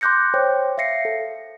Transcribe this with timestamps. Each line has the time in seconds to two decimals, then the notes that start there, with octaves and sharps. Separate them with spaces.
0.01 C6 D6 F#6 G6 A#6 C#7
0.34 C5 C#5 G5
0.78 E5 F5 A#6 C7 C#7
1.05 A4